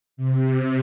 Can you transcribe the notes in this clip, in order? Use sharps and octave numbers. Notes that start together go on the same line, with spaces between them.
C3